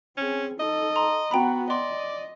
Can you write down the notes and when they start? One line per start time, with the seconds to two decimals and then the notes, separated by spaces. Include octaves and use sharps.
0.18 C4 C#4 G#4
0.60 D#4 A4 D#5
0.96 A#5 C6
1.31 B3 F#4 G5 A#5 B5
1.70 D5 D#5 C6